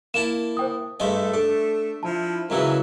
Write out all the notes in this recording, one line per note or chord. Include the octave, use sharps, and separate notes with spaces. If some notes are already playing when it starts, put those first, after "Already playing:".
A#3 E4 A5 E7
C5 G5 D#6
G2 G#3 A3 D#5 E5
D4 A4
F3 E4 A5
G#2 C#3 E3 F#3 A#4 E5